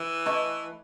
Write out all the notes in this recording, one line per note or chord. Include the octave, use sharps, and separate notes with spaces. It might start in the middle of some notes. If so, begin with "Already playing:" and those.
Already playing: E3
A3 E4 B4 D#5